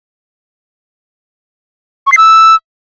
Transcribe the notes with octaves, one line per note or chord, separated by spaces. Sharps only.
C#6
C7
E6